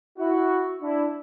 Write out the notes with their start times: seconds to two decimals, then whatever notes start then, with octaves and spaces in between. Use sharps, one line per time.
0.18 E4 F#4
0.81 D4 E4